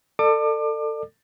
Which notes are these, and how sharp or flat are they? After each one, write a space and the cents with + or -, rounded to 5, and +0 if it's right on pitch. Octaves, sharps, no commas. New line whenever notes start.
A4 +25 D5 +35 D6 +30